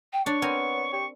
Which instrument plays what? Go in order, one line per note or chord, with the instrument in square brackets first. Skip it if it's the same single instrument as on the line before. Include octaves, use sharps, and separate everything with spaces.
[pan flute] G5
[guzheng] D4 [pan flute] C#5 [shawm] C#6
[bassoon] B3 [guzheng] C4 A#4 G#5 [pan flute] C#5
[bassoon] G4 [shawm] C#6